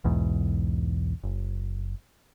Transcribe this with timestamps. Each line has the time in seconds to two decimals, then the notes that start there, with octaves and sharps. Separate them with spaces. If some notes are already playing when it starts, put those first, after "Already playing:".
0.04 B1 E2 G#2
1.24 F#1